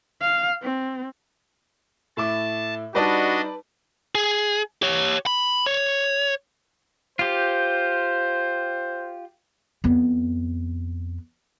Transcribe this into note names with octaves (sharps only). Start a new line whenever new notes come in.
F5
C4
A2 E4 A5 D6
G3 D4 D#4 F#4 B4 D5 D#5 A5
G#4
G4 C#5
B5
C#5
F4 G4 C5
F2 B3